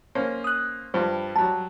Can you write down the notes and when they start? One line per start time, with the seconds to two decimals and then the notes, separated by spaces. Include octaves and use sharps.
0.15 A#3 C#4 C5
0.44 D#6 F#6
0.94 G2 F3 G3 C5
1.36 F#3 G3 A5